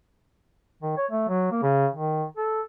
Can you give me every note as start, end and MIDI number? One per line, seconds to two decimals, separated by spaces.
0.83 0.93 51
0.97 1.06 73
1.11 1.24 57
1.28 1.51 54
1.51 1.58 58
1.63 1.87 49
1.94 2.24 51
2.37 2.61 69